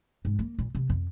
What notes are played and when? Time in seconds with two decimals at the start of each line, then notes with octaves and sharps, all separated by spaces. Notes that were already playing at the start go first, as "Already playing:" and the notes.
0.25 G#2
0.39 A#3
0.59 A#2
0.75 C3
0.90 F2